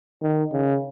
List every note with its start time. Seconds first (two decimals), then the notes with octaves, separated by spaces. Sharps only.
0.22 D#3
0.53 C#3